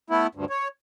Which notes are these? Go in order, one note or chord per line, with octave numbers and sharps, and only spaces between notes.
A3 B3 E4
D2 G2
C#5